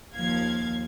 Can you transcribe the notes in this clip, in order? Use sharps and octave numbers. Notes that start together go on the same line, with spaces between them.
D#2 F3 F5 G#6